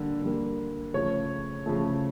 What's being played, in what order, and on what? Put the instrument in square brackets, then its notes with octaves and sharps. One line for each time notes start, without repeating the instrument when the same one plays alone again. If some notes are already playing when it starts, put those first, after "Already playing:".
Already playing: [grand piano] D3 G3 A#3
D3 G3 A#3
C#3 F3 A3 C#5
C#3 F3 A3